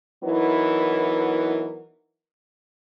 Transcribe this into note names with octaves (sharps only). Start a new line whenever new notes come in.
E3 F#3 B3 D#4 E4 A#4